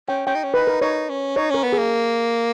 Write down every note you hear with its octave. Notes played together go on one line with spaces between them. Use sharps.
C#4 G5
C#4 G5
D#4
C#4
D#4 B4
A#4
D#4 C#5
C#4
D#4 C#5
C#4 A#4
B3
G#4
A#3